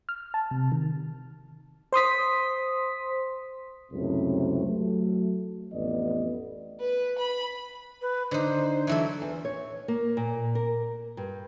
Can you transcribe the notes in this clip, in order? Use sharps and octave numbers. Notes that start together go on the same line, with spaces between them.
F6
A5
C3
D#3
C5 C6 D#6 B6
C#2 F#2 A2 C3
F#3 A3
A1 F2 B3 D5 D#5
B4
B5
B4
D3 D#4 C5
E3 F#3 A4 E5
E2
C#5
A#3
A#2
A#4
G2